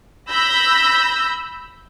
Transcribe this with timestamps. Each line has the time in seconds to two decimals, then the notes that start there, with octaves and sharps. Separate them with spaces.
0.30 B5 E6 G6 A#6